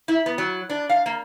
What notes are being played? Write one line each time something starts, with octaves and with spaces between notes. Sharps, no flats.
E4
B3
F#3
D4
F5
A#3